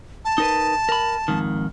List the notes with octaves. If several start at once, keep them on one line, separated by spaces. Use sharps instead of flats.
A5
D#4 A#4 B4
A#4 B5
F2 G#2 D#3